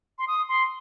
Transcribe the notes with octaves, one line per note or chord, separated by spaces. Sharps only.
C6
D#6
C6